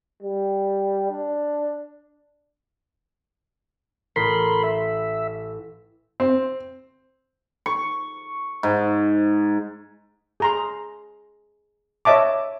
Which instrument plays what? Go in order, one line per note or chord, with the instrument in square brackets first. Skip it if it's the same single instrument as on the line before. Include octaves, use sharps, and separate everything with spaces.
[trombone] G3
D4
[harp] A1 [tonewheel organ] A#4 B5 C6
[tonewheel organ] E5 [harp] B6
[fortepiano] C4
[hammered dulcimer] C#6
G#2
[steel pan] G#4 A#5 C6
C#5 D#5 E5 A5 D6